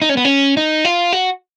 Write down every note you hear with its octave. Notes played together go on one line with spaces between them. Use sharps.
D#4
C#4
B3
C#4
D#4
F4
F#4